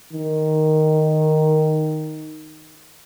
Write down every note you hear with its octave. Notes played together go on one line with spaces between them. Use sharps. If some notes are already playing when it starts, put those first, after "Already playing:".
D#3